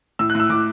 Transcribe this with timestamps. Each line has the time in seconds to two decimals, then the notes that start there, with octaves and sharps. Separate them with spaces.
0.19 A2 E6
0.30 F#6
0.35 A2 E6
0.50 A2 D6